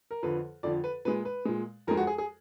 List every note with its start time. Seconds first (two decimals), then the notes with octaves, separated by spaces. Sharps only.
0.11 A#4
0.23 F2 D3 F3 B4
0.63 F2 D3 F3 D5
0.84 B4
1.05 A#2 G#3 B4
1.25 B4
1.45 A#2 G#3
1.87 F2 F3 G#3 A#4
1.97 F#4
2.07 G#4
2.18 G#4